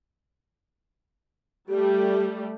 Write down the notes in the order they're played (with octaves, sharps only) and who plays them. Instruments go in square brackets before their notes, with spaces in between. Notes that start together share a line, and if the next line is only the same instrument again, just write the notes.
[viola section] G3 A3 [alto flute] G4